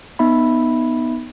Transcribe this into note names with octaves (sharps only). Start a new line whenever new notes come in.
B3 D#4 E5 B5